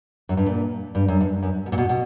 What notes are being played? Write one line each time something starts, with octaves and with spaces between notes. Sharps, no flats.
F#2
G2
A#2
G2
F#2
G2
F#2
B2
A#2
B2
B2